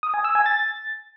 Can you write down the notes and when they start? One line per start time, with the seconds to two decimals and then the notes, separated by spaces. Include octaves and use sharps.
0.03 D#6
0.14 G#5
0.24 E6
0.35 G#5
0.46 A6